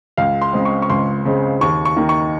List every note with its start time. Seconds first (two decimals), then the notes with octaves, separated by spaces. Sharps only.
0.17 C#2 F5
0.42 C6
0.53 C#3 G#3 C4
0.65 C#6
0.82 C#6
0.90 C#2 C6
1.25 C#3 G#3 C4
1.61 D#2 C#6
1.85 C#6
1.97 D#3 A#3
2.09 C#6